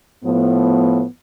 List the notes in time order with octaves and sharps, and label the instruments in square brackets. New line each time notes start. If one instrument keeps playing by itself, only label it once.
[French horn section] A2 F3 B3